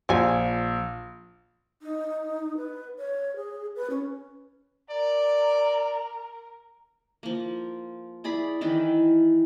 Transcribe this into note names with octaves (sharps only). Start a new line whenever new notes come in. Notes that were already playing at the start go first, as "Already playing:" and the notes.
A#1 F3 G#5
D#4
B4
C#5
G#4
B4
C#4
A#4 D5
F3 A#3
E4 G#4 D5 B5
D#3 E3 E4 G5